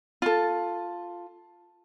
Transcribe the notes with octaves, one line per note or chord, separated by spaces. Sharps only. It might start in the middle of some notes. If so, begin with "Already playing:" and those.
F4 A4